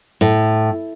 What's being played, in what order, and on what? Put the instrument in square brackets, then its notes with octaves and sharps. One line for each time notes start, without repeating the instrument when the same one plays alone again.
[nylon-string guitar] A2